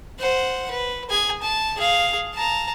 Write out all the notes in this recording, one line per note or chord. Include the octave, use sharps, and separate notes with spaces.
C5 F#5
B4
G#4 G#5
A5
G#4 F5
A5 A#5